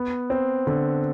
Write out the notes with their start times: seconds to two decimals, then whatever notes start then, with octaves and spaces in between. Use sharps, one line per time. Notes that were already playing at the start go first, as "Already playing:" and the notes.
Already playing: B3
0.30 C4
0.67 D3